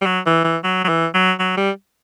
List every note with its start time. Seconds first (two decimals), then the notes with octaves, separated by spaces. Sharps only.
0.01 G3
0.06 F#3
0.26 E3
0.44 E3
0.64 F#3
0.84 F#3
0.89 E3
1.14 F#3
1.39 F#3
1.57 G3